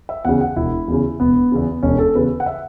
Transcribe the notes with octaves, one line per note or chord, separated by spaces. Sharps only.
E5
E2 C#3 F#5
F#5
E1 E4
E2 C#3
E1 B3
E2 C#3
E1 C#4
A4
E2 C#3 B4
F#5
E5